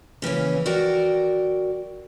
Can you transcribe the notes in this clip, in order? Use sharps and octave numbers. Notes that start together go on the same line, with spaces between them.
C#3 E3 A#3 C#4
F#4 A#4 D5 G5